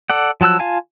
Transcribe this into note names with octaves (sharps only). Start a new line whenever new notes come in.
A4 D5 F#5
F3 F#3 A5 E6 F#6
F4 F5 G#5 A5